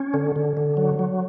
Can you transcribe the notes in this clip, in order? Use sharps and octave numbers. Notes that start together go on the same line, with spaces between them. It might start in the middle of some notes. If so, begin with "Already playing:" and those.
Already playing: C#4
D3
D3
D3
F#3
F#3